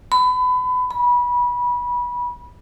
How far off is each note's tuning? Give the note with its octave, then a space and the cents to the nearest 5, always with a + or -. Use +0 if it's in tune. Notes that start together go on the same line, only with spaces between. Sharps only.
B5 +30
B5 -20